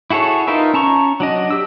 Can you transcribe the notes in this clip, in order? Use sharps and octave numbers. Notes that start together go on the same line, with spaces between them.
E4 F#4 G#4 A4 C#5
D#4 F4 A#4 B4 E5
C#4 A5 A#5 C#6
F#3 D4 D#5
G4 E6